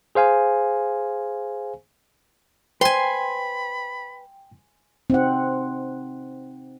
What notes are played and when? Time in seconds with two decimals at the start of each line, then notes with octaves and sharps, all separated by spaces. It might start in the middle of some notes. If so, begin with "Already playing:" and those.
0.15 G#4 C5 F5 G#5
2.81 B4 C5 G5 G#5 B5 C6
5.10 C4 D#4 F#5